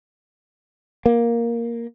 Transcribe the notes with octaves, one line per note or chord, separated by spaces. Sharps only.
A#3